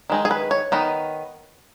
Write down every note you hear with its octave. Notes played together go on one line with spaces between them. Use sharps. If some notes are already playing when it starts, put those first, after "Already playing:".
D#3 G#3 D#4
G#4
B4
C#5
D#3 B3 D#4